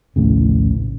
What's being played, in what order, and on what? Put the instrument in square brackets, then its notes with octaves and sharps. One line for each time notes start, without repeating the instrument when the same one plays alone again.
[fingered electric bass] A#1 D#2 A2 C#3